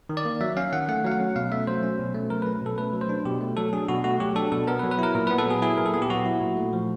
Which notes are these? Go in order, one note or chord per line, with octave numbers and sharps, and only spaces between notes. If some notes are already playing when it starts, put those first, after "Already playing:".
D#3
D5
A#3
F#3 E5
C#4 F5
D#3 F#5
A3 F#5
F#3 F5
F#5
C#4
B2 F5
A3 E5
F#3 C5
C#4
B2
A3
F#3 A#4
B4
C#4
B2 A4
A3 B4
F#3
C5
D4
B2 G4
A3
F#3 A4
D4 G#4
B2 F#4
A3 F#4
F#3 G4
D4 A4
B2 A4
B3 A#4
B4
F#3
B4
E4 A#4
A#2 A#4
B4
B3
A4
F#3 G#4
E4 G#4
A#2 A#4
A4
B3 G#4
G4
F#3 F#4
E4
A#2
A3
F3